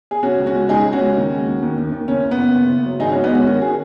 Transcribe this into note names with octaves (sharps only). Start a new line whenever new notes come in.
G#4
C#3 C#4 F#4
C#2
C#4 F#4
G#3
G#3 D#4 G#4
C#2
C#4 F#4
G#3
D#2
G#3
D#2
D#2
D#2
D#2
F#1 C#4
F#1
B3
F#1
F#1
F#1
F#3
G#1 D#4 G#4
C#4 F#4
G#1
B3 D#4
G#3 C#4 F#4
D#3 C#4 F#4
D#3 G#4